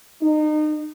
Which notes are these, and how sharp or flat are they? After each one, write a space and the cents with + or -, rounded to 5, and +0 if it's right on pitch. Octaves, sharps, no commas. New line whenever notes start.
D#4 -30